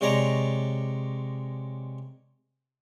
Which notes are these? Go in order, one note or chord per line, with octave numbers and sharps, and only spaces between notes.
C3 G#3 C#5 D5 A#5